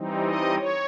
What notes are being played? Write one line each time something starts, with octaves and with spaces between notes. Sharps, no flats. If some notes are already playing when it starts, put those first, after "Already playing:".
Already playing: E3 G3 C4 D#4
D#5
C#5